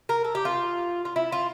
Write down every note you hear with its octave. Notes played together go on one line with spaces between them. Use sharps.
A#4
A4
G4
F4
F4
E4
F4